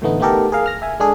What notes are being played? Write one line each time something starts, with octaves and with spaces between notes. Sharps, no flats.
A2 D3 E3 A3 B3 D#4
A3 B3 D#4 G4 A4 A#4
G#4 A#4 F5
F6 A#6
E5 G#5
G#3 D4 G#4 A4